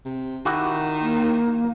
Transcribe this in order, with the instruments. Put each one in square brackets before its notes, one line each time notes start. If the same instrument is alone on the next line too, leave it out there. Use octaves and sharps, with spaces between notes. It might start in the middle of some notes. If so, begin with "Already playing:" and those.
[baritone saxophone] C3
[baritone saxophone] D#3 [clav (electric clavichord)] E4 F#4 G4
[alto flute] A#3